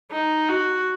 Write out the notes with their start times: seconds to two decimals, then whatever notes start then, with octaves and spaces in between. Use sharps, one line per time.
0.11 D#4
0.49 F#4